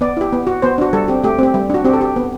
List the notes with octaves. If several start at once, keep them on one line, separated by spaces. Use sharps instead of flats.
B3 D5
E4 G4
B3
F#4
B3 C5
D4 F#4
G3 A4
C4 G4
A3 G4
C4 G4
G3
D4 F#4
C4 G4
A4
G4
B3